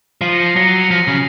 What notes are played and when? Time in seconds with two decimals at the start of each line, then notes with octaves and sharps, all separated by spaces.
0.21 F3 C7 D#7
0.33 A#6 C#7
0.45 C7
0.56 F#3 A#6 C#7
0.67 C7 D#7
0.79 C#7 F7
0.90 F3 A#6 C#7
1.08 C#3